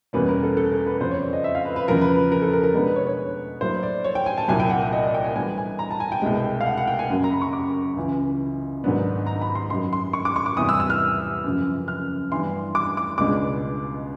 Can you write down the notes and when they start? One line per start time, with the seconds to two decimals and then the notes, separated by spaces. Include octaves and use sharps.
0.13 E2 B2 G3 A#3 C#4 B4
0.29 A#4
0.43 A4
0.57 A4
0.71 A#4
0.86 B4
1.00 F2 C#3 F3 C5
1.11 C#5
1.22 D5
1.33 D#5
1.44 E5
1.55 F5
1.65 B4
1.76 B4
1.88 E2 C#3 F3 A#4
2.01 B4
2.32 A#4
2.42 A4
2.53 A#4
2.64 A#4
2.74 B2 G#3 B3 D4 B4
2.86 B4
2.96 C#5
3.07 C#5
3.61 A2 F#3 A#3 D4 C5
3.83 D5
4.04 C#5
4.15 G5
4.26 G#5
4.38 A5
4.48 C2 A#2 F#3 G#5
4.60 G5
4.70 F#5
4.81 G5
4.93 D#5
5.03 D5
5.14 G5
5.24 G#5
5.35 A2 E3 G3 B3 D4 G#5
5.58 G#5
5.79 A#5
5.90 A5
6.00 G#5
6.12 G5
6.22 C2 B2 G#3
6.61 F5
6.66 F#5
6.77 F#5
6.87 G5
6.99 G#5
7.10 F#2 C#3 F#3 A#3 C#4
7.24 A#5
7.32 B5
7.42 C#6
7.53 D6
7.96 C#2 C#3 E3
8.84 G#2 D#3 F#3 B3 D4
9.26 A#5
9.41 B5
9.55 C6
9.70 F#2 D#3 F#3 C6
9.93 C6
10.13 C#6
10.25 D6
10.36 C#6
10.46 D6
10.57 E2 C3 E3 G3 B3 D#6
10.69 E6
10.80 E6
10.90 F6
11.44 F#2 C#3 F3
11.88 F6
12.31 G2 E3 G3 B3 D4 C6
12.75 D6
12.97 D6
13.18 C#2 B2 G#3 B3 D4 D6